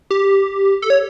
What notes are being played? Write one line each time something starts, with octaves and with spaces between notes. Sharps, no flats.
G4
A4
C#5